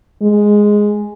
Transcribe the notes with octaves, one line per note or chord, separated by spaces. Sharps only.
G#3